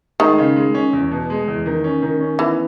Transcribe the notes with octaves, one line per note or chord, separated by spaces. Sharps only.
D#3 G#3
C#3
G#3
C#4
E2
B2
G#3
E2
D#3
C#4
D#3
C#4
E3 B3